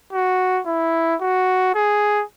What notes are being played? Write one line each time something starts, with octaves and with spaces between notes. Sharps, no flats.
F#4
E4
F#4
G#4